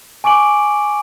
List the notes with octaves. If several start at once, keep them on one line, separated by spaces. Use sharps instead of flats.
G#5 C#6 D6 D7 F#7